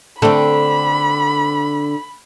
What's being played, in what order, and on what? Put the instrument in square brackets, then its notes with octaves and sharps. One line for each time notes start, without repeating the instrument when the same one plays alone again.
[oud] D3 C4 [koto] A3 [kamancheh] B5